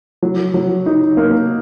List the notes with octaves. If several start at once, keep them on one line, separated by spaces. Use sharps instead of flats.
F#3
F#3
D#4
A#3